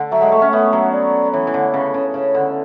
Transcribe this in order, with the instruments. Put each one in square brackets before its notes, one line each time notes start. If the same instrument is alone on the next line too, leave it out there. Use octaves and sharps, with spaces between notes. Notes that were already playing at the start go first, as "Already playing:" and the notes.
Already playing: [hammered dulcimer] D3
[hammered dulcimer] F#3 [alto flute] E5
[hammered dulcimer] G#3
A3
C#4
[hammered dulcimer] B3 [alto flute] E5
[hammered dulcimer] F#3
[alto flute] D5
[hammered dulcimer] E3 [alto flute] C#5
[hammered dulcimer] E3
D3
C#3
C#3
[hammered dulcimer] C#3 [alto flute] C#5
[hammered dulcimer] D3